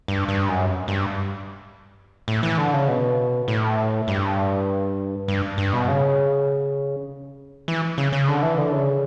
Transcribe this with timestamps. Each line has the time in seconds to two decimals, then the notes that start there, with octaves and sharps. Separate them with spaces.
0.08 G2
0.28 G2
0.48 F#2
0.88 G2
2.28 A2
2.43 E3
2.58 D3
2.73 C#3
2.88 B2
3.48 A2
4.08 G2
5.28 G2
5.58 G2
5.73 B2
5.88 C#3
7.68 E3
7.98 C#3
8.13 C#3
8.28 D3
8.42 E3
8.58 D3
8.72 C#3